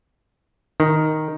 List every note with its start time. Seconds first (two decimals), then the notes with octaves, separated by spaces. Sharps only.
0.80 D#3